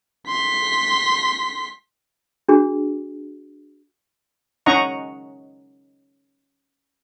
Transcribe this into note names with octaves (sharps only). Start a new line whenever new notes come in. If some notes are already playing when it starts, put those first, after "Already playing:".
C6 B6
D4 F#4 G#4
C#4 D#4 D#5 F#5 A#5 C#6